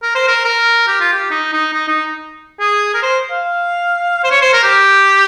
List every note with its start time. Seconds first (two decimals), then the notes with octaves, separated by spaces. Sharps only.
0.03 A#4
0.15 C5
0.28 A#4
0.45 A#4
0.88 G4
1.01 F4
1.13 G4
1.31 D#4
1.53 D#4
1.73 D#4
1.88 D#4
2.60 G#4
2.94 A#4
3.03 C5
3.31 F5
4.24 C5
4.31 C#5
4.42 C5
4.53 A#4
4.63 G4